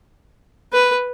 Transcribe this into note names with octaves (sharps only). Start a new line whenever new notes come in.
B4